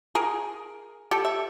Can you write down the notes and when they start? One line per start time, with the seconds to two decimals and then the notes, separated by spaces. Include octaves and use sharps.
0.15 G#4 A#4
1.11 G4 A4
1.25 E5